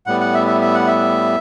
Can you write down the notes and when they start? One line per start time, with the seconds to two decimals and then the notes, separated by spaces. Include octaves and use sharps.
0.06 A2 G3 B3 F#5
0.20 F#5
0.34 E5
0.47 E5
0.61 E5
0.74 F#5
0.87 E5